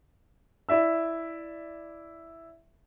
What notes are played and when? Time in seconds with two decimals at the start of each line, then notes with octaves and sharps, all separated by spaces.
0.69 E4 D5 E5 E6